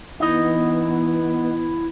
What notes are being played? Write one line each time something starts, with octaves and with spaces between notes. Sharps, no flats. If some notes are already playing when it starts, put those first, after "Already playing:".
E3 B3 D#4 E4 D#5